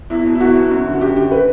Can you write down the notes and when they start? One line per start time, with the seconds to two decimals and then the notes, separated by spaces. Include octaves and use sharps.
0.10 E2 E4
0.26 B2
0.35 E4
0.40 E2 F#4
0.56 B2
0.71 F#2
0.86 D3
0.93 F#4
1.01 F#2 G4
1.16 D3 G4
1.31 B4